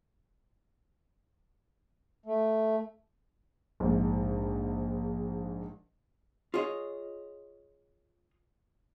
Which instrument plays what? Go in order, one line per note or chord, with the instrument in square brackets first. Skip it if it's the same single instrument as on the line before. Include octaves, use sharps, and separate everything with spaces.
[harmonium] A3
[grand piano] A#1 G#2
[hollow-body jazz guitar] F4 G#4 C#5 D#5